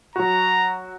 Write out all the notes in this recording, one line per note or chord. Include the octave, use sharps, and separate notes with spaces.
F#3 F#4 A#5